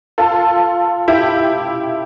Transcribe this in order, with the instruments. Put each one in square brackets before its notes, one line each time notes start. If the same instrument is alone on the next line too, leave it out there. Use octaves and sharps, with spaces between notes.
[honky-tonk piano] F4 A4
E4 G4